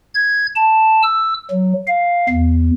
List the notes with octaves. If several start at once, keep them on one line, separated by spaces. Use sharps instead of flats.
G#6
A5
E6
F#3
F5
E2